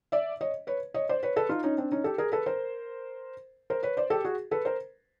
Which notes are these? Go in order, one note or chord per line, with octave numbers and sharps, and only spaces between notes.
D5 E5
C#5 D#5
B4 C#5
C#5 D#5
C5 D5
B4 C#5
A4 B4
D#4 F4
C#4 D#4
C4 D4
C#4 D#4
G4 A4
G#4 A#4
A4 B4
A#4 C5
A#4 C5
B4 C#5
C5 D5
G4 A4
F#4 G#4
A4 B4
A#4 C5